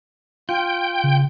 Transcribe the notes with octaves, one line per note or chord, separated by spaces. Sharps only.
F4 G5
C#3